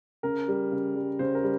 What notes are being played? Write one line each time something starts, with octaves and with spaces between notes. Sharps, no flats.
C#3 A#4
G3
C#3
G3
C#3 C5
A#4
G3